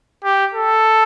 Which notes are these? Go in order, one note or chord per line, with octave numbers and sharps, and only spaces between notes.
G4
A4